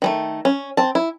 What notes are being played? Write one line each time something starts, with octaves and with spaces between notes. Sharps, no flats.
D#3 G#3 A3
C#4
C4 A5
E4